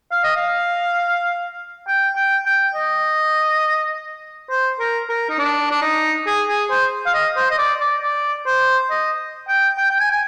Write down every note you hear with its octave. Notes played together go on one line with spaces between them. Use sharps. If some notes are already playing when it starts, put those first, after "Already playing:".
F5
D#5
F5
G5
G5
G5
D#5
C5
A#4
A#4
D#4
D4
D4
D#4
G#4
G#4
C5
F5
D#5
C5
D#5
D5
D5
D5
C5
D#5
G5
G5
G5
G#5
G#5